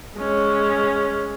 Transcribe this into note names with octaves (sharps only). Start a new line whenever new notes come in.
G#3 C#4